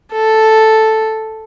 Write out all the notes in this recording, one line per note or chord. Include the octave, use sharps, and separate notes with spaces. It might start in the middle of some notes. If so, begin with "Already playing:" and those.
A4